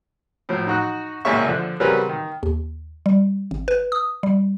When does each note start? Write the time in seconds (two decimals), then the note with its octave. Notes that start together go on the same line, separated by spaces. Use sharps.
0.49 A2 F3 F#3
0.67 D#4 F#4 F#6
1.25 G#1 F#2 A#2 C#3 E5 C#6
1.47 D3 F3 F#6
1.80 C#3 F#3 G3 C4 A#4 B4
2.09 D#3
2.43 D#2
3.06 G3
3.51 G#1
3.68 B4
3.92 D#6
4.23 G3